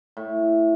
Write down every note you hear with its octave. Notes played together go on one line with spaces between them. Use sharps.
A2